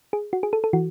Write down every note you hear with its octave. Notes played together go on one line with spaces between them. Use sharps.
G#4
F#4
G#4
A4
A4
E3 F#4